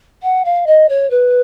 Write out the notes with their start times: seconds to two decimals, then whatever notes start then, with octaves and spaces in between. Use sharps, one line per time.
0.22 F#5
0.45 F5
0.66 D#5
0.89 C#5
1.10 B4